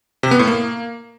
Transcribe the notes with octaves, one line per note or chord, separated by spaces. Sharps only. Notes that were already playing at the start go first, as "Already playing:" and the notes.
C3
B3
A2
A#3